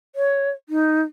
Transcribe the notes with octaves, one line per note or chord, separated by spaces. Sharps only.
C#5
D#4